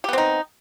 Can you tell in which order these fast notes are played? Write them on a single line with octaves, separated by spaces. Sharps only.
G4 B3 C4 D#4